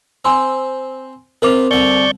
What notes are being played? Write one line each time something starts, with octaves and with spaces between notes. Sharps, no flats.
C4 G#5 C6 E6
C3 F4 A#4 D6 F7
C2 D3 D5 C#6 G6